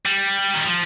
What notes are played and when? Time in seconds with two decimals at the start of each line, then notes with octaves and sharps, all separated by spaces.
0.06 G3
0.54 D#3
0.65 F3